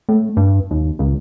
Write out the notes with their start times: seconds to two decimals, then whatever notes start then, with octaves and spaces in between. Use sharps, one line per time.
0.09 A2
0.37 G2
0.71 D#2
0.99 C#2